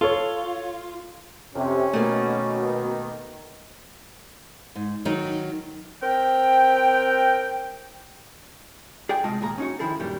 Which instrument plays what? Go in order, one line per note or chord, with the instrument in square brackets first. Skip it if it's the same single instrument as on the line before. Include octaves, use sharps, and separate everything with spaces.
[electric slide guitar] F4 [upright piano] A4 C#5
[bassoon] F2 [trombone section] C3 [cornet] C#4
[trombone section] B2 [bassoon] D#3 [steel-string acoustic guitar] A3 A#3
[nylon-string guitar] G#2
D#3 F#3 D#4
[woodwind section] C4 A#4 G5
[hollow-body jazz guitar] G#4 D5 G5
C3 G#3 A3 F4 D#5 A5
D#2 A#2 G#4 A#5
C#4 D#4 F#4
D#3 F3 E4 G#4 A4
F#2 A#2 D#3 G3